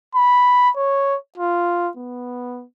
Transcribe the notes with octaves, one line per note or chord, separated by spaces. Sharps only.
B5
C#5
F4
B3